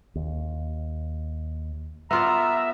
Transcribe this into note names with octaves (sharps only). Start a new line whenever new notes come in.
D#2
B3 F4 D5 E5 A#5